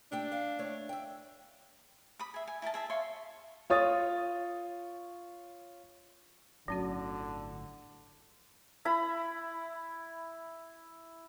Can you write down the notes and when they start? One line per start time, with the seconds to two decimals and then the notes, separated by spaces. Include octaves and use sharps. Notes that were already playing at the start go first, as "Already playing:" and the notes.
0.12 A3 D4 G4 G5
0.32 F5
0.59 A3 C#5
0.89 E5 G5
2.19 B5 D#6
2.34 G#4 E5
2.47 G#5
2.62 E4 A#4 D#5 A5
2.74 G#4 E5 A5
2.90 C#5 E5 F5 C6
3.70 F4 C#5 D#6 A6
6.68 G1 A2 D3 F#3 C#4 F#4
8.85 E4 B5